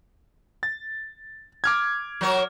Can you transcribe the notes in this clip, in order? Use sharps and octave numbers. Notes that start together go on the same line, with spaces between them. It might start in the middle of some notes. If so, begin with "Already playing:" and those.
A6
D6 F6 G#6
F#3 A#4 C#5